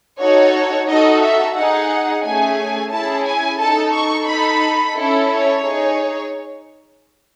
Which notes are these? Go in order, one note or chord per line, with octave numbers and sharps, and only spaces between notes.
D#4 F#4 A4 C#5
D#4 F#4 A4 D#5
E5
D#4 G#4 F#5
A3 C#4 G#4 G#5
C#4 E4 G#4 A5
G#5
D#4 A4 A5
C#6
D#4 A4 B5
C#4 E4 A4
C#5
D#4 G#4